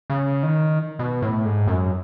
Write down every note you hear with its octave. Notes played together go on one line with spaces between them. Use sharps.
C#3
D#3
B2
A2
G#2
F#2